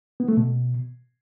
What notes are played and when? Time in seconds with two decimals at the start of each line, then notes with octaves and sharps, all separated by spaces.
0.20 B3
0.29 A3
0.37 B2